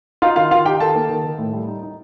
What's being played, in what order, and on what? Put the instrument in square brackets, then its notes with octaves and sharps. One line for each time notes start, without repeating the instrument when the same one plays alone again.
[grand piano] D#4 F4 F5
D#3 F4 F5
D#3 F4 F5
D#4 G4 G5
D#3 A4 A5
A#3
D#3
D#3
A2
G3
D#4
D#4